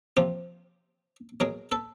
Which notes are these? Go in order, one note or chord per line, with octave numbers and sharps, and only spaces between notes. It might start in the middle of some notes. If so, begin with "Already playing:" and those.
C3 F3 F4 G4
B2 F#3 G#4 A#4
A4 B4